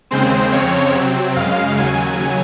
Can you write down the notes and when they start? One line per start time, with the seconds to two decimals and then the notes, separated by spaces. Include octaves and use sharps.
0.11 D#2 C#3 G#3 C4 C5
0.52 F2 C#3 F3 C4 C#5
0.94 C3 F#3 C4
1.36 F#2 C#3 G#3 F5
1.78 D#2 C#3 F#3 G#5